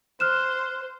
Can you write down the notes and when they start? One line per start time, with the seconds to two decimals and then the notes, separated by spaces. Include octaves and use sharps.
0.20 C5 F6 F#6 E7